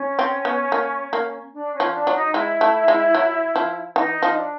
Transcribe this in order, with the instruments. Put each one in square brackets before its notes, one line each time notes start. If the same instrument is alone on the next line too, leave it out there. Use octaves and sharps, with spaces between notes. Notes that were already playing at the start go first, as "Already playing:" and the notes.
Already playing: [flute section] C#4
[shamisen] C4
B3
A#3
A#3
[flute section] D4
C#4
[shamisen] F3
[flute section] D4
[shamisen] F#3
[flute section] D#4
[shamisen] G#3 [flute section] E4
[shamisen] A3
G#3
F#3
F3
[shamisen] E3 [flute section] D#4
[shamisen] F3
[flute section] D4